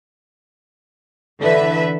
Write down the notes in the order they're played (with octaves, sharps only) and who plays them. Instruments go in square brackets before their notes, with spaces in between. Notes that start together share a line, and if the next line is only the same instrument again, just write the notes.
[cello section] D3 E3 B4 E5